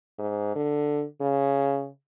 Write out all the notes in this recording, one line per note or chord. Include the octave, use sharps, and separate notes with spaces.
G#2
D3
C#3